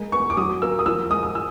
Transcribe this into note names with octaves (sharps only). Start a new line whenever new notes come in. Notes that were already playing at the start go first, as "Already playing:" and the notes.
Already playing: G#3 A#3
B3 C#6
D6
F#3 D#6
A#3 E6
D#6
F3 E6
G#3 D#6
D#6
E6